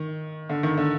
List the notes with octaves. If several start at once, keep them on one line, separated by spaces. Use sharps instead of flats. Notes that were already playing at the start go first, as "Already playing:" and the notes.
Already playing: D#3
D3
D#3
D3